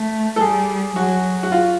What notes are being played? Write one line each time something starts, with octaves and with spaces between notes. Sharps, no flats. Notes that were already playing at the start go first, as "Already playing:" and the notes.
Already playing: A3
A4
G3 G#4
F#3 F#4
F#4
F4